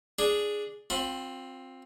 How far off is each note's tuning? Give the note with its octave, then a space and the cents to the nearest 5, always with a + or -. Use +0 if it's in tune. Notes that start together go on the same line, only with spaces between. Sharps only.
D4 +0 G#4 +0
C4 +10 F4 +35 B5 +0